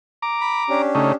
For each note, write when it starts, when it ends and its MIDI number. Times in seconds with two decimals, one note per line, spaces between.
0.22 0.82 82
0.22 0.82 86
0.41 0.63 83
0.69 1.14 61
0.69 1.14 62
0.69 1.14 67
0.95 1.12 49
0.95 1.12 57
0.95 1.12 63